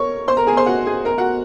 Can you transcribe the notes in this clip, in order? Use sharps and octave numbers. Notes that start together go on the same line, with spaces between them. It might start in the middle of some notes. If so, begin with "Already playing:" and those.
Already playing: A#4 C#5 C#6
C5 C6
A#4 A#5
G#4 G#5
C5 C6
F#4 F#5
G#4 G#5
A#4 A#5
F#4 F#5